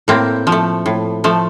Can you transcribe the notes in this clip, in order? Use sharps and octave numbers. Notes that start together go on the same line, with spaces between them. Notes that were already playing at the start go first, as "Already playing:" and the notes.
A2 A#3 C4
F3
A3
A2
F3 A3